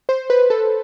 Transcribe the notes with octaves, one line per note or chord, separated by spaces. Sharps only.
C5
B4
A4